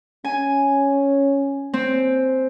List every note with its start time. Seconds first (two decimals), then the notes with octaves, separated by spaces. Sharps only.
0.25 C#4 G#5
1.74 C4